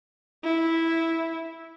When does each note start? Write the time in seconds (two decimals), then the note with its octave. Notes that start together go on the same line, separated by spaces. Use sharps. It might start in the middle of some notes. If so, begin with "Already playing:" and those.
0.44 E4